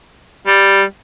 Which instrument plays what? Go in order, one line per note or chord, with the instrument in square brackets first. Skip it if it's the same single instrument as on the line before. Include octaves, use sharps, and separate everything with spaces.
[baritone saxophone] G3